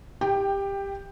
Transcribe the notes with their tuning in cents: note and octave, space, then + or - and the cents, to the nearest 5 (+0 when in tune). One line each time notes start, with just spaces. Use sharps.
G4 +15 G5 +0